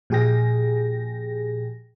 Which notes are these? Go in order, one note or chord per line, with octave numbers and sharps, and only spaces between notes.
A#2 F3 G4 G#4 G5 A#6